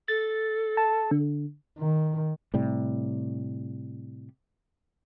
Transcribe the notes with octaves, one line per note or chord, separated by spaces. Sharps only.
A4 A6
A5
D3
D#3
A2 C3 G3